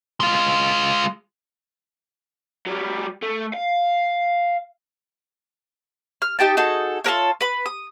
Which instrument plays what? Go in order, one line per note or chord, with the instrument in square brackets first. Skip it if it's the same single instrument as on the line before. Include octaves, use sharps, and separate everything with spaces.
[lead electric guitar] G#3 F4
[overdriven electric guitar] F#3 G3
A3
F5
[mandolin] F6
D#4 G4 G5 A5
D#4 F#4 G#4 A4
F4 A4 A#4 C#5
B4 B5
D#6